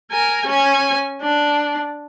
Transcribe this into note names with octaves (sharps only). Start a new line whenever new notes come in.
A#4 G#5
C#4 G#5
D4